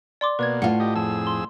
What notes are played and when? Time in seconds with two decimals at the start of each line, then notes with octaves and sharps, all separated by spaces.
0.21 D5 C6 D6
0.39 B2 A#3 B4 D5 G#6
0.62 A2 F4 F#5
0.80 G4 D#5
0.96 F2 G#4 A5 E6
1.27 C6